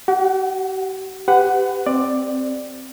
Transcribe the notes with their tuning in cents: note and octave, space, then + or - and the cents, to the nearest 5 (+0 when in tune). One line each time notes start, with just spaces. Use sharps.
G4 -45 F#5 +0
G4 +5 B4 +35 F#5 +0
C4 +0 D5 +10